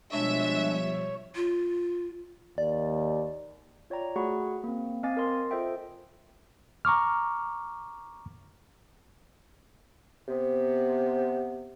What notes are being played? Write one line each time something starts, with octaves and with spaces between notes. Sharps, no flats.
B2 F3 G3 G#3 D4 C#5 E5
F4
D#2 D5
F4 C#5 D5 G5 A#5
A3 F#4 G#4 F#5 B5 C#6
A#3 C4
C4 D#5 F5 G#5 D6 A6
A#4 D#5 C6
F4 A4 C5 D#5 E5 G5
A#5 C#6 D6 F6
C3 B3